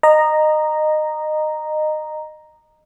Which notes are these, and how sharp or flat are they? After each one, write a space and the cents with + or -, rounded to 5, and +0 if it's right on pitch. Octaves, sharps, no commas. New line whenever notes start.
D#5 -20 A#5 +0